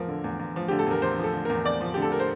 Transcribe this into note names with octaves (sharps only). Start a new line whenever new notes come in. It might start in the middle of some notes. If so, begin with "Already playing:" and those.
Already playing: E2 F3 A#4
D3
E2
E2
F3
D3 G4
A4
E2 A#4
E2 C5
F3
A4
D3
A#4
E2
E2 D5
F3
D3 G4
A4
A#4
C5